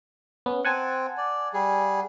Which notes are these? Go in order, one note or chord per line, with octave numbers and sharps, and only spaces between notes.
B3 C#4
C4 F#5 G#5 A5
D5
G3 G#4